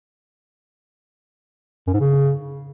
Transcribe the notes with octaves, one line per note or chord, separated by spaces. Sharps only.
F#2
G#2
C#3